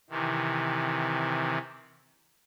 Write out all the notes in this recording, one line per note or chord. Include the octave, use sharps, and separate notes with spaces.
C3 D#3 E3